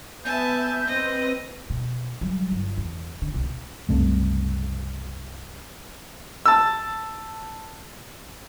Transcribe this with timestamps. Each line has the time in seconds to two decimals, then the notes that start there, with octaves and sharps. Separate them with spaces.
0.25 B3 E5 G#5 A5 G6
0.87 C4 B4 D#5
1.70 B2
2.21 F#3 G3
2.52 G1
2.78 E2
3.22 D3
3.34 B1 C3
3.89 F#1 C2 C3 A3
6.46 A5 E6